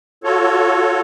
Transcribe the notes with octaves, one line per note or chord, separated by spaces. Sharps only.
F4 F#4 A4 C#5